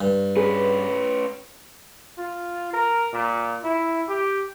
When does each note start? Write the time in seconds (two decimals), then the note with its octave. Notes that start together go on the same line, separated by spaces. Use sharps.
0.01 G2
0.37 C#4 G#4 B4
2.18 F4
2.73 A#4
3.13 A#2
3.64 E4
4.08 G4